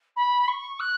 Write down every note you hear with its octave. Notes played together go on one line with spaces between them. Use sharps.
B5
C#6
F#6